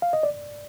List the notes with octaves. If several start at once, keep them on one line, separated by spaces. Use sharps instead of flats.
F5
D#5
D5